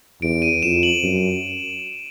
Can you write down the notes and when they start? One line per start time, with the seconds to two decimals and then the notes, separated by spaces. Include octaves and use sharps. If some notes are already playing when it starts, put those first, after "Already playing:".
0.22 E2 D7
0.42 D#7
0.63 F2 E7
0.83 F#7
1.03 F#2